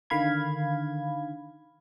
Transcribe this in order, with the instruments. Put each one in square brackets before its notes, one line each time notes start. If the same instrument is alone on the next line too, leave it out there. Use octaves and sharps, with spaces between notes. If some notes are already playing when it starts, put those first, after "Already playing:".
[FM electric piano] D3 D#3 F5 B5 G#6